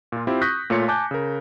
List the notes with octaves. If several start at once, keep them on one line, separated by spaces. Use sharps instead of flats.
A#2 F4
C4 E4 F4 G4
C#6 D#6 F#6 G6 A#6 B6
A#2 A3 F4 C#5 C#7
G#5 A5 D6 F#6 G6
C#3 A#4